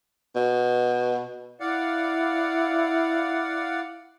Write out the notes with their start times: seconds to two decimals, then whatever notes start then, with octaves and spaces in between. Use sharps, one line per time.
0.36 B2
1.60 E4 D5 F5 F#5